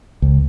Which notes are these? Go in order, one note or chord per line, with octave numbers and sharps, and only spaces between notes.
C#2